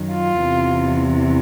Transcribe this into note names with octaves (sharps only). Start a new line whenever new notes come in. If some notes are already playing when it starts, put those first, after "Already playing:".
Already playing: F#2 D#3 F#3
F4
E2 C3 E3